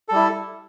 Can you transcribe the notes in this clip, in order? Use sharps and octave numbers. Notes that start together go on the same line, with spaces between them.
G3 E4 A4